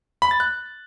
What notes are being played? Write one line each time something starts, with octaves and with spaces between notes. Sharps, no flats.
B5
A6
F#6